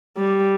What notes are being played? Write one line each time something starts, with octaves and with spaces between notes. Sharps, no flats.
G3